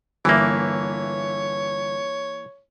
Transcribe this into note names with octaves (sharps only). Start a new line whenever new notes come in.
G1 E3 A#3 C#5 E5